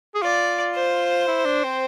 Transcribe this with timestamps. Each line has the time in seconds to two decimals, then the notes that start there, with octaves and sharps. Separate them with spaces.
0.15 G#4
0.22 F4 D5
0.75 C5
1.28 E4
1.45 D4
1.64 C4